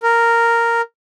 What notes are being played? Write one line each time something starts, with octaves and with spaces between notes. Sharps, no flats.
A#4